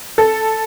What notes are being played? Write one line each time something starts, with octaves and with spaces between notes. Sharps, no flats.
A4